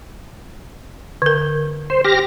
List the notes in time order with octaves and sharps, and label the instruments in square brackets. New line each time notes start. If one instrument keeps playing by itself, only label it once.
[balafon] D3 A#4
[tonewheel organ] C5
G4 F6 A#6